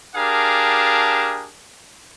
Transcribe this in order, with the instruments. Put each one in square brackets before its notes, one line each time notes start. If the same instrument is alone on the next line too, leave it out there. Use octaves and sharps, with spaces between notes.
[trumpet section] D4 G4 G#4 A#4 F5 A5